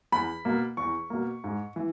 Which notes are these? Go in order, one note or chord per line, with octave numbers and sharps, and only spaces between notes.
E2 B5
B2 A#3
E2 C#6
B2 A#3
G#2
E3